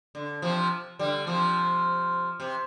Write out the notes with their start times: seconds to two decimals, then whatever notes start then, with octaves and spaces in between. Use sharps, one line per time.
0.15 D3
0.42 C3 F3
0.99 D3 G3
1.27 C3 F3
2.40 C3